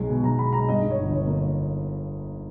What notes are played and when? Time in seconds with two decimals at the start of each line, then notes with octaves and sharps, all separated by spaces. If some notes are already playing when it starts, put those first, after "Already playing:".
Already playing: B1 G#3
0.09 B2
0.23 B1 A#5
0.39 G#3 B5
0.53 G#3 A#5
0.68 G2 D#5
0.83 G2
0.90 C#5
0.97 G1
1.12 G1 C#5
1.27 A#3